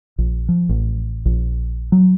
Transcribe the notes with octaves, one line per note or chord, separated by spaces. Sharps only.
A#1
F3
A1
A#1
F#3